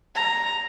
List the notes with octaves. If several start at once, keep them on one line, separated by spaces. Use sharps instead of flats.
A#5